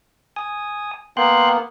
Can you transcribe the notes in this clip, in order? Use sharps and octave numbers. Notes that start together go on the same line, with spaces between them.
G#5 D#6
A#3 B3 G5 C6 F#6